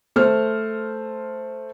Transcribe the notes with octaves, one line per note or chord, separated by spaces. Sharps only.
A3 C5 F6